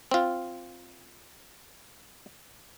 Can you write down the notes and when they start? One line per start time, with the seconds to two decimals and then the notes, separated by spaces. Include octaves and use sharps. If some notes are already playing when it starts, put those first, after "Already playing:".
0.11 C4 F4